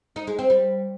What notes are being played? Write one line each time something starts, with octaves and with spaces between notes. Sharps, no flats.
D#4
G#3
C4
G3